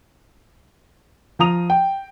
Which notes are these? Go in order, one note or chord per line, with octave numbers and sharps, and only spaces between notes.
F3 F5 A#5 D#6 F7
G5